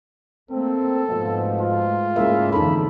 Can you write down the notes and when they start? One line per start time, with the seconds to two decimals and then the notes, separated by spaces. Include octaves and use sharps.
0.51 A3 A#3 C4 A4
1.09 G#2 B2 F3 A3
1.61 F4
2.16 C#3 G#3 A#3 E4 E5
2.53 F2 D3 E3 D#4 A4 B5